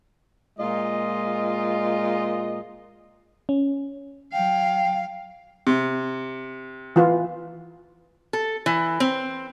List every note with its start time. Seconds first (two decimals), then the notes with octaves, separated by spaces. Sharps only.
0.58 A#2 G#3 F4 D#5
3.49 C#4
4.33 F#3 F5 G5
5.67 C3
6.96 E3 F4 B4
8.33 A4
8.66 E3
9.00 C4